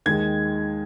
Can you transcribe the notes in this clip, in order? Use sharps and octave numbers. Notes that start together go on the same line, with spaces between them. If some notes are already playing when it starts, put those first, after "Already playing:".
D#2 D#3 G#3 G#6